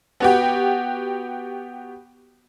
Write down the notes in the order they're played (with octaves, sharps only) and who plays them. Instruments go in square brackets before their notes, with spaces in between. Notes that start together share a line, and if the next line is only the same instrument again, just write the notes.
[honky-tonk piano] B3 F#4 G4